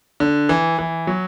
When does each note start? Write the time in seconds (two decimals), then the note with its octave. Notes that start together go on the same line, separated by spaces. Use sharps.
0.20 D3
0.49 E3
0.79 E3
1.07 F#3